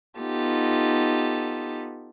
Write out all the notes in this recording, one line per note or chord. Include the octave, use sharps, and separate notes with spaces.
B3 D#4 F4 G4 A4